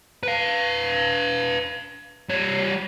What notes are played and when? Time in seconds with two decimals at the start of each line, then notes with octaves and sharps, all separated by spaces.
0.23 B4 F5
2.29 G3 C#5